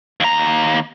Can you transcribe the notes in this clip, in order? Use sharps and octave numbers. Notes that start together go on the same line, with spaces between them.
D#2 A#5